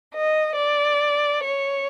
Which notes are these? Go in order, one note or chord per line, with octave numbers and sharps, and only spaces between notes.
D#5
D5
C#5